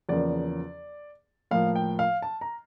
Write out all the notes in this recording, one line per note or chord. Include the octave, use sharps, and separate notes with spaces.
E2 C#3 F3 A#3 D5
A2 F3 A#3 F5
G5
F5
A5
A#5